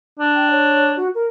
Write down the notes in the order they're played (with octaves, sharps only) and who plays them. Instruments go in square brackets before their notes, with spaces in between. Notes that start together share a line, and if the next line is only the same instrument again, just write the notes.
[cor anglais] D4
[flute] G5
C#5
F#4
A#4